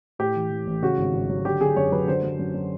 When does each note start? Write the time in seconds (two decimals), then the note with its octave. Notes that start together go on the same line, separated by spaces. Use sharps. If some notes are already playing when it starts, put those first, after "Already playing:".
0.19 A2 G4
0.36 E3
0.50 E3
0.67 A1
0.82 C#3 F#4
0.98 G#1
1.13 G#1
1.29 F#3
1.45 D3 G4
1.61 D3 G#4
1.76 F#2 C#5
1.92 F#3 B4
2.08 D3 C5
2.23 F#3
2.39 F#2
2.54 F#3